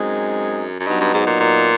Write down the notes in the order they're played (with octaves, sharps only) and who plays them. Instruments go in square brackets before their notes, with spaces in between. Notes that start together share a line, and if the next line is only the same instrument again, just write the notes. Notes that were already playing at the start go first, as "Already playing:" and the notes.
Already playing: [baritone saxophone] F#2 [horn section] G#3 C4 D#4 G#4
[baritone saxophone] F#2
[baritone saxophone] G2 [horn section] F#3 B3 D#4
[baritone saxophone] G2
G#2
A#2
A#2